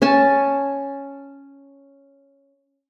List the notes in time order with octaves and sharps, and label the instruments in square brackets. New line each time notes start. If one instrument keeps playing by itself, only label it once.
[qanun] C#4 G#5 A5